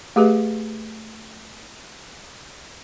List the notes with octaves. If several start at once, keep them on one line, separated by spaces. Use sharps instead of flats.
A3 G4 G#4 B4 E5